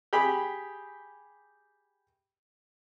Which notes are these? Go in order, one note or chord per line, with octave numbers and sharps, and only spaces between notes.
G4 G#4 G5 B5